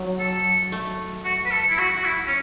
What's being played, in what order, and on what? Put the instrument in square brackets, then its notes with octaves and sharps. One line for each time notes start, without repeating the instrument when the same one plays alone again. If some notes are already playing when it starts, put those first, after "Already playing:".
Already playing: [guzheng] F#3
[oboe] A4
[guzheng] A3
[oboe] F#4
B4
A4
E4
F#4
F#4
E4
C#4